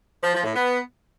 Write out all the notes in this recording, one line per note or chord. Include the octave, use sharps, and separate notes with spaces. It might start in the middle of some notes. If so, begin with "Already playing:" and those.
F3
F3
A2
B3